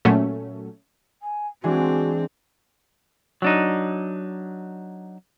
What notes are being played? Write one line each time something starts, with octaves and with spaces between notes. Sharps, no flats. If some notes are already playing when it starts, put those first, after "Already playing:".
A#2 F#3 A3 C#4
G#5
E3 G#3 C4 D4 F#4
F#3 D4 D#4